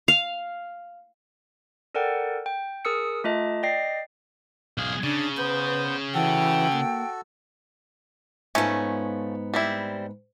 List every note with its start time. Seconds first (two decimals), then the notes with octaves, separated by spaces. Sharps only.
0.08 F5
1.95 A4 A#4 D5 F#5 G5
2.46 G5
2.85 G#4 A#4 D#6 E6 C#7
3.24 A3 F4 D#5 A5
3.63 D5 D#5 G5 A#6 C7
4.78 B1 G#4 F5
5.04 C#3 D4 D5
5.37 B3 B4 C5
6.14 E3 F#4 A4 G5
6.73 A#3
8.55 G#2 F3 A3 B3 C#4
9.54 G3 C4 E4